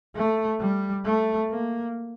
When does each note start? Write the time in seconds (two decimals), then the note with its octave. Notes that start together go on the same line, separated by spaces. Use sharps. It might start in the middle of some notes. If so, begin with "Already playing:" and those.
0.16 A3
0.60 G3
1.06 A3
1.50 A#3